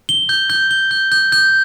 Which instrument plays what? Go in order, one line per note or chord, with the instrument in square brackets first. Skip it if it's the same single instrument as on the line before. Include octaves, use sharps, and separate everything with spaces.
[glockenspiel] G7
G6
G6
G7
G6
G6
G6